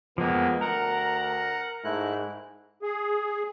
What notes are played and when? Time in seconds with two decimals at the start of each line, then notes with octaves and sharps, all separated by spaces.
0.18 F2 F3 G#3 A#3 B3
0.61 D2 A#4 F#5 A#5
1.84 G#2 A3 E4 F#6
2.82 G#4